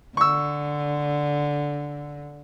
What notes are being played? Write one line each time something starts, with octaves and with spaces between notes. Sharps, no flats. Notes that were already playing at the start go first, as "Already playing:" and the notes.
D3 C#6 E6